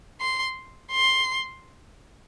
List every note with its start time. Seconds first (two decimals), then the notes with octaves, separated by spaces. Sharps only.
0.21 C6
0.92 C6